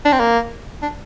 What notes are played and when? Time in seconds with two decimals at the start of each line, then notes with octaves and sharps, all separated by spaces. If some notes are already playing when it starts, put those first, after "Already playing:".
0.05 D4
0.13 C4
0.20 A#3
0.82 D4